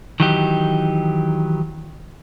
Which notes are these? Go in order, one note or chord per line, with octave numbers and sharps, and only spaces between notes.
D#3 E3 F#3 D#4 G4